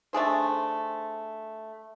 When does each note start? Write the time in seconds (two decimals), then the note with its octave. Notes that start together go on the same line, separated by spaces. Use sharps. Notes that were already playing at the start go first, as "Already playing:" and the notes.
0.13 A3 D4 G#4 C5